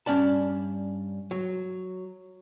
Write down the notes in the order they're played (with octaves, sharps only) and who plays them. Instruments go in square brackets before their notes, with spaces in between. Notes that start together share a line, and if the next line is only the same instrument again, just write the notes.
[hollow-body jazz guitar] G2 C#4 D5 A5
F#3